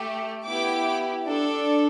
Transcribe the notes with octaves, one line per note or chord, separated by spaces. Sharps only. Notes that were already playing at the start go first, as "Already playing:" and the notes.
Already playing: A3 G4
B3 E4 G4 D6
D4 A4